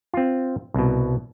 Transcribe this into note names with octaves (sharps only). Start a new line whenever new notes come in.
C4 F4
C2 B2